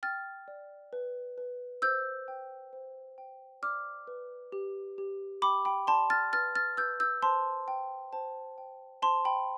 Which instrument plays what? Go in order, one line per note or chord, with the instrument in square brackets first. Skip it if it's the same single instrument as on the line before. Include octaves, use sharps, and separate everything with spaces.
[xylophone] G5 F6 A6
D5
B4
B4
C5 E6 G6
G5
C5
G5
D5 D6 F6
B4
G4
G4
G5 B5 D6
G5 B5
D5 A5 C6
F6 A6
B4 F6 A6
F6 A6
B4 E6 G6
E6 G6
C5 A5 C6
G5
C5 A5
G5
C5 A5 C6
G5 B5